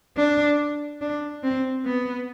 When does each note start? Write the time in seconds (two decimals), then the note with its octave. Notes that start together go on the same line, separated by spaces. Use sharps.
0.17 D4
1.01 D4
1.43 C4
1.85 B3